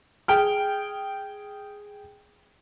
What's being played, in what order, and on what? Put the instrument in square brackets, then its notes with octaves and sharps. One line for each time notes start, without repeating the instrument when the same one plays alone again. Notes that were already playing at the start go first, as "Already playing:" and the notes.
[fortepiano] G#4 G5 F6